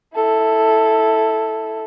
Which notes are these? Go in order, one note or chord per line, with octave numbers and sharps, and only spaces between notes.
E4 A4